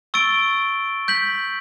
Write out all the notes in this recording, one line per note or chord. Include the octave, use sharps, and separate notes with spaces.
C#6 E6 A6 D7 G7
G6 B6 F#7